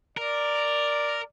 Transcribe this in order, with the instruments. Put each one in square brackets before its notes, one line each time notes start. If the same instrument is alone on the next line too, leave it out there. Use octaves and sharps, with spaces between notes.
[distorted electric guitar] A#4 [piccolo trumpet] D5